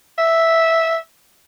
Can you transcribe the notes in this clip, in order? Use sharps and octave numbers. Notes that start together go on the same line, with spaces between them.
E5